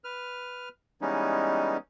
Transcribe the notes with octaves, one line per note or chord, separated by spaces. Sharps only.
B4 F6
E3 G3 G#3 B3 C#4 D#4